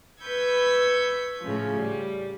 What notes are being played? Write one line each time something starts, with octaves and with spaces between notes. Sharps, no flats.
B4 B5 C#6 E6 G6 G#6
A2 C#3 F3
G3